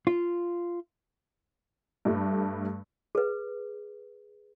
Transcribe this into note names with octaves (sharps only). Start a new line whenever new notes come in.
F4
G2 G3 A3
G#4 B4